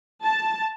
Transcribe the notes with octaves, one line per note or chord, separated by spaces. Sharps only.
A5